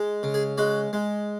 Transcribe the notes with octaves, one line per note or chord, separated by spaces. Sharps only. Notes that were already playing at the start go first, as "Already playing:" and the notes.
Already playing: G#3
C#3
G#4
G#3 F#4
G#3